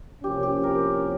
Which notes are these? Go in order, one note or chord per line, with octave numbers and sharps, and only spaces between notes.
C2 C3 F3 A#3 C#4 G4
G4
A#4